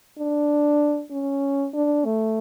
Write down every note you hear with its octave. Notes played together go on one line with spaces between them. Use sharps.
D4
C#4
D4
A3